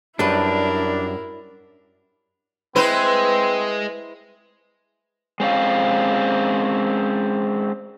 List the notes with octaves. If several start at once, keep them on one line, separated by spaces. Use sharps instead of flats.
F#2 G3 D4 E4 A#4 B4
G#3 C4 E4 B4 C5
G#3 C4 C#4 F5